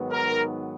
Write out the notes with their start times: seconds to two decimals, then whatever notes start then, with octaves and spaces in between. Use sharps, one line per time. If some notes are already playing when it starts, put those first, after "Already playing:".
Already playing: G#2 D#3 F#3 B3
0.12 A#4